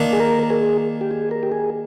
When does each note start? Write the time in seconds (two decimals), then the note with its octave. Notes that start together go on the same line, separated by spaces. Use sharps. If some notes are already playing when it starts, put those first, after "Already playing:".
Already playing: D#3 A#3 D4
0.13 G#4
0.20 A#4
0.43 A#4
0.50 G#4
1.01 G4
1.11 G#4
1.31 A#4
1.43 G4
1.52 G#4